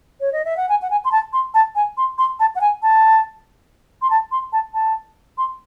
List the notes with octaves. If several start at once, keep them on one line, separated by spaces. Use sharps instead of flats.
C#5
D#5
E5
F#5
G#5
F#5
G#5
C6
A5
C6
A5
G#5
C6
C6
A5
F#5
G#5
A5
C6
A5
C6
A5
A5
C6